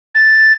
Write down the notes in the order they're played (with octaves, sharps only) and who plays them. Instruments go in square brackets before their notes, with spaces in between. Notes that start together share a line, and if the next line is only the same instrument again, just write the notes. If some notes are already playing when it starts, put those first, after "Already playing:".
[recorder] A6